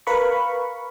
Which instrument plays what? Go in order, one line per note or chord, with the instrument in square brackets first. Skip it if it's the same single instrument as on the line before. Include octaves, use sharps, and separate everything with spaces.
[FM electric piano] A#4 B4 F5 B5 C#6